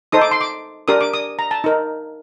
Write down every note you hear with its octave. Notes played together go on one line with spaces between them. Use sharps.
D#4 A4 C5 D#6
D6
C6
D6
D4 G4 A#4 D#6
D6
D#6
A#5
A5
D#4 A#4